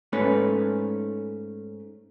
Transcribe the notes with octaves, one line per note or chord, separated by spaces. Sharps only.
G#2 A3 C#4 B4